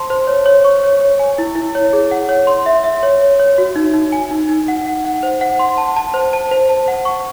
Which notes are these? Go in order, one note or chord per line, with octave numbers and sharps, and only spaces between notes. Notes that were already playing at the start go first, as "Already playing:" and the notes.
Already playing: C5 A5 C6
C5
C#5
C#5
C#6
C#5
C#5
G#5
E4
E4
C#5
G#4
F#5
C#5
C6
E5
E5
C#5
C#5
C#5
F#4
D#4
D#4
G#5
D#4
D#4
F#5
F#5
F#5
C5
F#5
C6
A5
A5
C5
A5
C5
A5
F#5
C#6